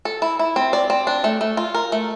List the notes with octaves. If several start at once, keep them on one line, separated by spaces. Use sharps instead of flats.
A4
E4
E4
C4
D5
C4
D4
A3
A3
F4
A#4
A3